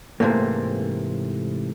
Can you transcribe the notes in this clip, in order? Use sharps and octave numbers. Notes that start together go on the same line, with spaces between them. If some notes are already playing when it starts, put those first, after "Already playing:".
G#2 C3 E3 A3 A#3